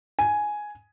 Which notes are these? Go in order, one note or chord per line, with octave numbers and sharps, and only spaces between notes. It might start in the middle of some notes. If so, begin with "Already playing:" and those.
G#5